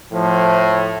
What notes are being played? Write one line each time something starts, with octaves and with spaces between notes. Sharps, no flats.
A2 F3